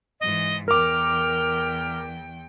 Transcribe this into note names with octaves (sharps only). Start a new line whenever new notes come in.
G#2 E3 D#5
E2 A#4 G5 D6 F6